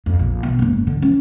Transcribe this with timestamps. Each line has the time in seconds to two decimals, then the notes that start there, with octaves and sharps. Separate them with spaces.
0.06 F2
0.19 A#1
0.43 B2
0.59 F#1 G#2
0.87 D3
1.02 C#4